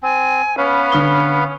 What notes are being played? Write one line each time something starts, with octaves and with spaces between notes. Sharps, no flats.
C4 G#5
B3 C#4 B4 F5
D3 D#6 G7